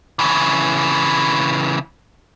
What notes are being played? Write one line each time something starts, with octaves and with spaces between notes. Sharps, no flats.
C#3 E3